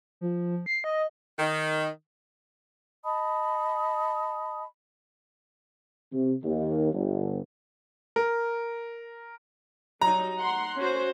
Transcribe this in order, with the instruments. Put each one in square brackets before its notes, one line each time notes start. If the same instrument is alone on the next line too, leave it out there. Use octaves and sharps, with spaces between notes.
[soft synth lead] F3
C7
D#5
[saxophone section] D#3
[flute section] D#5 A5 B5 D#6
[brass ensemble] C3
D#2
G1
[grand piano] A#4
[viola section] F#3 G3 D#4 [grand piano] A#5
[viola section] F#5 C6
C#4 F#4 C5